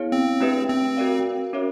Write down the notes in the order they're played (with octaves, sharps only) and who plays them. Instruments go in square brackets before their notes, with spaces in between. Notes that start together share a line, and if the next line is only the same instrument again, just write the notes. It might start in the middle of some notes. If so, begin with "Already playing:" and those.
Already playing: [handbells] B3 E4 G#4 C#5 F5
[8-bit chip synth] C4
[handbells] A3 D4 G4 B4 E5
[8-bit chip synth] C4
[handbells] F#4 A#4 D5 F5
C#4 F#4 A#4 C#5 E5